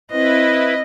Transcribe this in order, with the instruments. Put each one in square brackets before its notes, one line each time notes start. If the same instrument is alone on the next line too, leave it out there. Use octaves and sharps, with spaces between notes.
[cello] C4 [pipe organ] E4 B4 [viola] D#5